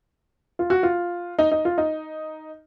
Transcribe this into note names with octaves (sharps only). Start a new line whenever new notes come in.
F4
F#4
F4
D#4
D#4
F4
D#4